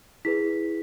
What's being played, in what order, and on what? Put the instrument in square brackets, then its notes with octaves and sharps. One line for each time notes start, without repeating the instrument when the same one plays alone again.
[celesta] E4 G#4 B4 B6